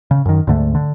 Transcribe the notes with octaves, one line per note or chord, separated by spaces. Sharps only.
C#3
F#2 D#3
D2 G#2 D3 A3
D3